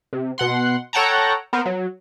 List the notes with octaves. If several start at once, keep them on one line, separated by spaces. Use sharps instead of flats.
C3
B2 F#5 C6
A4 C#5 F#5 G5 A5 A#5
B3 A#4 C5
F#3